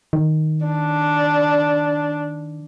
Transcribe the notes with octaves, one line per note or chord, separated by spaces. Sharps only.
D#3
D4